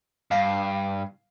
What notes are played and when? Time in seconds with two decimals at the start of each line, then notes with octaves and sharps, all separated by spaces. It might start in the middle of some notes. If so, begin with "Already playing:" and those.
0.31 G2 F5